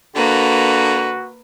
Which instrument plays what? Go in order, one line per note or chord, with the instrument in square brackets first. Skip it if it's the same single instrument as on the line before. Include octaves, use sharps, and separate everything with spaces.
[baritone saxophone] D3 [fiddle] A#3 [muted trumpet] F#4 [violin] B4